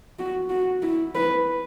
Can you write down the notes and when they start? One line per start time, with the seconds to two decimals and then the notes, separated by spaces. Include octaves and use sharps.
0.19 F#4
0.50 F#4
0.83 E4
1.15 B4